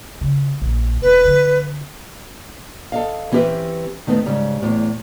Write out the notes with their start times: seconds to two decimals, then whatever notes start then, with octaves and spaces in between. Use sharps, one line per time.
0.21 C#3
0.61 A#1
1.02 E1 B4
1.25 D3 F3
2.92 A4 D#5 F5
3.32 E3 C4 C#4 G4 B4 E5
4.07 D#3 A3 B3 C4
4.26 G#2 C#3 G3
4.62 E2 A2